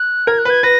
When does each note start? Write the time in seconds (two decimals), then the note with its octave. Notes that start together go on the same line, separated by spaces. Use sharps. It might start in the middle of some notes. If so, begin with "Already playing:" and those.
Already playing: F#6
0.27 A#4 G#6
0.39 F#6
0.45 B4 G#6
0.63 B4 A#6